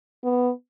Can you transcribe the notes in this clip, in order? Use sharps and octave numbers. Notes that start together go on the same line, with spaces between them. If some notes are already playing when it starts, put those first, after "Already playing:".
B3